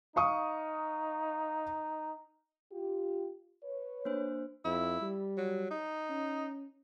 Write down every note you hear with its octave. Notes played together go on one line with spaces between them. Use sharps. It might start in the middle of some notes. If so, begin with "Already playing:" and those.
D#4 F5 C#6 D#6
F4 G4
B4 C#5
A#3 D4 C5
F2 E4
G3
F#3
D#4
C#4